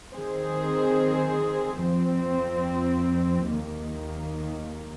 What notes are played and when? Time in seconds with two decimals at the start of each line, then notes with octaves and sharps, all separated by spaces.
0.13 D#3 C4 G#4 C5
1.82 F2 F3 C4
3.50 D#2 D#3 A#3